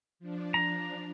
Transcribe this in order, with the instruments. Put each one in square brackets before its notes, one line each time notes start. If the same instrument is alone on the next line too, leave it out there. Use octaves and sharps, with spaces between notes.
[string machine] F3 D4
[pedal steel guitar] A#5